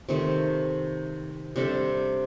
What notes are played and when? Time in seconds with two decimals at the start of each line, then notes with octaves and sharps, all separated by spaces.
0.09 C3 D#3 A3
1.56 C3 G3 D4 A4